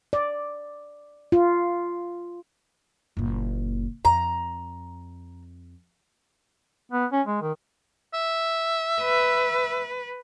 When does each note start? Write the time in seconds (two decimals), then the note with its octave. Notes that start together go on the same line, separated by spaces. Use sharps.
0.13 D5
1.32 F4
3.17 F#1 A#2
4.05 F2 A#5
6.92 B3
7.13 C#4
7.27 G#3
7.42 D#3
8.14 E5
9.02 B4